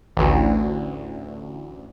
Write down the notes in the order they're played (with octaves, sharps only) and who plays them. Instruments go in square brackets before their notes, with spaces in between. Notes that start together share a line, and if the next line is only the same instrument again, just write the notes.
[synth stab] A1 D2